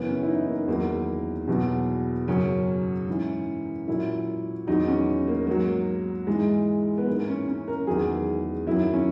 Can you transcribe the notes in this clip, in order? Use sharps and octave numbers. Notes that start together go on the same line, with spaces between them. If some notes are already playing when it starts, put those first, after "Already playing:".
Already playing: F#2 C#3 E3 B3
C#4
E4
D#4
A#3
E2 D#3 F#3 A#3
E2 B2 F#3
F#2 C#3 F#3 C#4
G#2 E3
A#2 F#3 E4
E2 D#3 F#3 D#4
C#4
A#3
G#2 F#3 A#3
G#2 E3 G#3
B3
G#2 E3 A#3
C#4
C#4
A#4
E2 D#3 F#3 G#4
F#2 D#3 F#3 E4
C#4